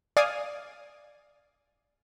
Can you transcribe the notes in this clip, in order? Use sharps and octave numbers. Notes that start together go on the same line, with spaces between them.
D5 F5 G#5 D#6